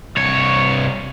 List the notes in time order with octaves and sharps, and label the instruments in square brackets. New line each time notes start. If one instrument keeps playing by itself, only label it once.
[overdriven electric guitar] C2 C#5